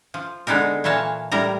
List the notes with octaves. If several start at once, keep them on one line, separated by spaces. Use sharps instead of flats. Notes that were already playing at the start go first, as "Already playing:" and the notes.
F3
D3 G#3 B3 D#4 A#4
A#2 E3 A#3 C#5 A5
A2 G3 A#4 A#5